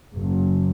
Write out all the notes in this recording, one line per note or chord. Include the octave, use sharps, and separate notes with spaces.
F#1